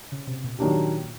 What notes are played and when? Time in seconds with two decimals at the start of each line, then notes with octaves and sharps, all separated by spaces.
0.12 C#3
0.27 C3
0.44 A#2
0.59 A#2 D#3 F#3 A#3 D4 G4